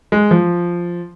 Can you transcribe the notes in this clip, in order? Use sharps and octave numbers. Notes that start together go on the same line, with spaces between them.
G#3
F3